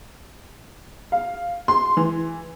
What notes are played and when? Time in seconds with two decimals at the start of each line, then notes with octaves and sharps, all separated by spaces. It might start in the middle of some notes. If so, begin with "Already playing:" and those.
1.12 F5
1.68 C6
1.97 E3